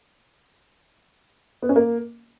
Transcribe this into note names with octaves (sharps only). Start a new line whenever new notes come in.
B3
C#4
A#3